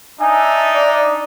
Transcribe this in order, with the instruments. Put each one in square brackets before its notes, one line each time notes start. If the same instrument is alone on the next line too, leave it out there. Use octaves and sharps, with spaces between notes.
[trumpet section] D4 D#4 E5 [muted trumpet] G#5
[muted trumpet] D5